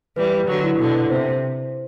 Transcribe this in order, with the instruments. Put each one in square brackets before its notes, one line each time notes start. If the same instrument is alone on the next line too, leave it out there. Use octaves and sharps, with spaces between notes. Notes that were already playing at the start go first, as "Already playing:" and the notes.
[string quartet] E3 G3 [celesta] B4
[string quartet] D3 F#3
[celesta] E4
[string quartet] B2 D3
[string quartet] C3 [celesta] C5